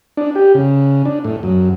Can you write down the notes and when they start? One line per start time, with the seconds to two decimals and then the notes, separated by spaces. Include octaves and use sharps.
0.17 D4
0.35 G4
0.55 C#3
1.05 D4
1.24 A2
1.43 F#2